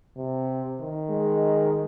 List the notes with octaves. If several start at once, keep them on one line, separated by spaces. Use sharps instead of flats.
C3
D#3
G#3